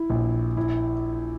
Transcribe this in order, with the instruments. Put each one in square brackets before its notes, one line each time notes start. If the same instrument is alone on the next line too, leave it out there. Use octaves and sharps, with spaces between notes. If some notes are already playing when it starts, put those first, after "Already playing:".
Already playing: [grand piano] E4
A#1
E4